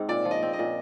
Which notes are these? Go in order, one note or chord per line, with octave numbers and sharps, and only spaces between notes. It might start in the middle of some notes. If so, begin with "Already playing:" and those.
Already playing: G#2 C4
A#2 D5
F3
D#5
C4
D#5
A#2